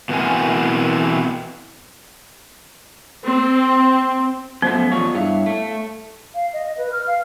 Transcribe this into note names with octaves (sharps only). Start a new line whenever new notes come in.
B2 E3 B3 C4 A#4 G#5
C4
F#2 F3 A3 B3 C5
E2 G3 F4 C#5 D#5
G2 E4 C#5 F5
A3
F5
D#5
D#5
B4
F6
F5